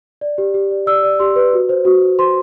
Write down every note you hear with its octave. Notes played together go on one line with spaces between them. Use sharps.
D5
G4
G4
D5
D5 E6
D5
G4 C6
B4
F#4
C5
F#4
F#4
C5 C6